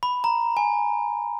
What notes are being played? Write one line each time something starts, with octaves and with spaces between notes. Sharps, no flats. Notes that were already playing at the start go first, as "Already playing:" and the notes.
B5
A#5
G#5